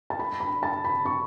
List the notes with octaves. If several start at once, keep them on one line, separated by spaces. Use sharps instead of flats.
A5
B5
B5
A5
B5
C#6